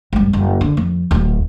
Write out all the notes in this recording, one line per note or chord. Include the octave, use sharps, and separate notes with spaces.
G#1 G2
F#1
D3
F2
D1 F4